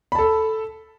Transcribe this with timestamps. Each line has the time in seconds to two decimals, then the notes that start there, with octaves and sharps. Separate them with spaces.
0.12 B5
0.15 A5
0.19 A4